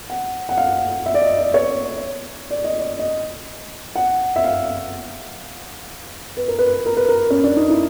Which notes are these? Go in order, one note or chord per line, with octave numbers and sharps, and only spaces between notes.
F#5
F#5
F5
E5
D5
D#5
D5
C#5
D5
D#5
D5
D#5
F#5
E5
F5
B4
A#4
B4
A#4
B4
A#4
C#4
D4
D#4
E4